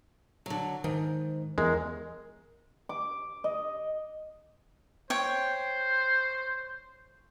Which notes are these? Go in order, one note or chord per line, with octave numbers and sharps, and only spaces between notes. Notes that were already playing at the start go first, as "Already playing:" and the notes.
D3 F#3
G#2 D#3
E2 G#3 A#4
D6
D#5
C5 C#5 G5